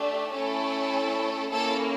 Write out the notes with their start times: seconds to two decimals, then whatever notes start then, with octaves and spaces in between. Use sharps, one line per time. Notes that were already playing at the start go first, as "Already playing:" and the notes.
Already playing: A3 D4 G4
0.33 A3 C#4 E4 A4
1.51 A#3 C#4 E4 A4